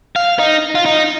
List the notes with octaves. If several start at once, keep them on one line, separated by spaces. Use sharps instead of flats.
F5
D#4
F4
D#4